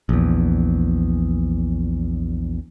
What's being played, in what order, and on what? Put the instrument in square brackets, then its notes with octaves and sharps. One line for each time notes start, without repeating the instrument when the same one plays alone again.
[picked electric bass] A#1 E2